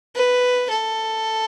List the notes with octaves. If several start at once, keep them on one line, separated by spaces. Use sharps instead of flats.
B4
A4